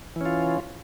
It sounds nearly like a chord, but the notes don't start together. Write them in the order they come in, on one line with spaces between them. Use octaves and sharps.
E3 C#4 F4